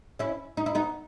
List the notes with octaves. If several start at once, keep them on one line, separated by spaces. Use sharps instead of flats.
C#4 E4
D#4
E4
B3 D#4